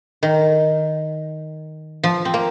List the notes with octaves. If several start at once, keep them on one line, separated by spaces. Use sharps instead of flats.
D#3
F3
C4
A#3